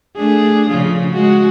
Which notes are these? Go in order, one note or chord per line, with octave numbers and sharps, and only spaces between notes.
A3 D4 G#4
C#3 F3 F4
G#3 F#4